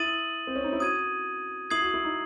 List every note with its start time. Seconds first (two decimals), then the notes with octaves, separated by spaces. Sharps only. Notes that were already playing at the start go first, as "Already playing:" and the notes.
Already playing: E4 D#6 A6 D#7 F#7
0.47 C4
0.55 C#4
0.64 D#4
0.73 E4
0.80 F#4 D#6 G#6 D#7
1.70 E4 D#6 G#6 C7 F#7
1.82 F#4
1.94 E4
2.05 D#4